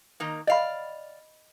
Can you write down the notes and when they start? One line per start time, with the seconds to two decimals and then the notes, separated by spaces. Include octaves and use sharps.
0.20 D#3 A#3 D#4
0.47 D5 D#5 F5 B5